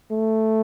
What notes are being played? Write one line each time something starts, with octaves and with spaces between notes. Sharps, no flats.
A3